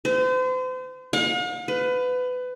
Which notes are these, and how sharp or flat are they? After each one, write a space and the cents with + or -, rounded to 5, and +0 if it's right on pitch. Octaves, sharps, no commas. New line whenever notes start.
C5 -40
F5 +45
B4 +25